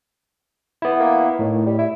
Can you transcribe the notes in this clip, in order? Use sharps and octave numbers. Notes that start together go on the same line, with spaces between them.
B3 E4
A#3
A2 D#3
G3
E4